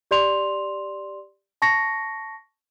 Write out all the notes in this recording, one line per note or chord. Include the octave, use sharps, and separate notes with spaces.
G4 D5 C6 F7
A5 C#6 A#6 C#7